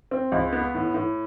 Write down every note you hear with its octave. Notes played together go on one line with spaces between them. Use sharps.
C4
C#2
B3
A2
A2